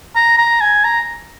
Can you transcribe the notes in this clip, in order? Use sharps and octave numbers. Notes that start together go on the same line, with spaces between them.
A#5
A#5
G#5
A#5